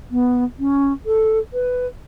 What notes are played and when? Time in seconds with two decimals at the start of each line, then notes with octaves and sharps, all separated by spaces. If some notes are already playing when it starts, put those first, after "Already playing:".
0.11 B3
0.59 C#4
1.05 A4
1.53 B4